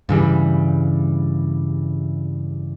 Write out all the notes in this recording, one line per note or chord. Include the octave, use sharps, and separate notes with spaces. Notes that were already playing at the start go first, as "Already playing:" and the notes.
G2 C#3 E3 G3